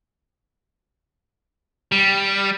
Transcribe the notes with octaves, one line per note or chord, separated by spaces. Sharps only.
G3